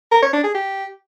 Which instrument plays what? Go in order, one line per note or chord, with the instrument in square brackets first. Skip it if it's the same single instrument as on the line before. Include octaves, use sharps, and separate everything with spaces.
[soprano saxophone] A#4
C#5
D4
G#4
G4